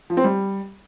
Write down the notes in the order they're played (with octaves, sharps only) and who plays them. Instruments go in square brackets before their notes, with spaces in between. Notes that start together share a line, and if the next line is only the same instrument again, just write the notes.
[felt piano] F3
C4
G3